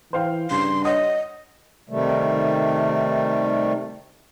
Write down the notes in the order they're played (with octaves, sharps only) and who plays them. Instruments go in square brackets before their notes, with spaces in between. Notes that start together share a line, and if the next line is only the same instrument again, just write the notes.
[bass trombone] E3 [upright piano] C5 F5 G5
[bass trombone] G2 [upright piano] C#3 [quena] C6
[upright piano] C#5 F#5 D#6 [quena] D#5
[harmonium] C3 D#3 G3 A3